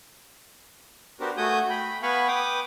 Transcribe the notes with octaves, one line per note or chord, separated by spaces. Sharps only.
B3 D4 F#4 G4 A#4 C5
A3 F#4 G#5 D#6 G6
G5 B5
B3 F5 G#5 B5 C#6
B4 G5 D6 D#6